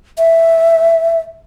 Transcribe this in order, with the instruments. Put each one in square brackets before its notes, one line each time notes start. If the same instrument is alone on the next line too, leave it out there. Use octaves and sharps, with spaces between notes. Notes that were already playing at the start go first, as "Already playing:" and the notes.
[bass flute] E5